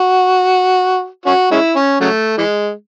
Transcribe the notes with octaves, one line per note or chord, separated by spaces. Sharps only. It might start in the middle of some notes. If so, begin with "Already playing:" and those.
Already playing: F#4
C#4 F#4
G#3 C#4 E4
C#4
C#3 F#3 A3
E3 G#3